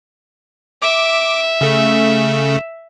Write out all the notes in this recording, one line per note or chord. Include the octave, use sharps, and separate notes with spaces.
E5 D6
C#3 A3